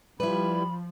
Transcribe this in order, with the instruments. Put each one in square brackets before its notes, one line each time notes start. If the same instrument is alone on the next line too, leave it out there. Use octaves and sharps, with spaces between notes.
[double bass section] F3 [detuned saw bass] G3 [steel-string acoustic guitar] E4 B4 [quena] B5